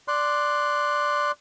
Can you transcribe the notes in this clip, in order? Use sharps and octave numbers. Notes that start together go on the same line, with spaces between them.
D5 C6 F#6